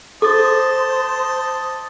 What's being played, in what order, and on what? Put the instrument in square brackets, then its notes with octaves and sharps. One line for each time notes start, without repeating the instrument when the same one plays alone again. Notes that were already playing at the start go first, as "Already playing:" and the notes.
[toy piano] A4 [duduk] C5 [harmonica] D#5 A5 [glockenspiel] D6 D#6 A6